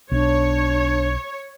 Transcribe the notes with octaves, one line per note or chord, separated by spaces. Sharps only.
B1 D4 C#5